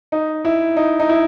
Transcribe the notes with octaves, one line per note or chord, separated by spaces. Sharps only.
D#4
E4
D#4
D#4
E4